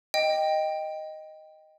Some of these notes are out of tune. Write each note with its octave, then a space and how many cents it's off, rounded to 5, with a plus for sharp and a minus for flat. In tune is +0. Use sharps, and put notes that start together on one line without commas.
D#5 +0 G5 +0